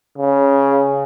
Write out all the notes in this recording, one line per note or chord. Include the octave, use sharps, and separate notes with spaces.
C#3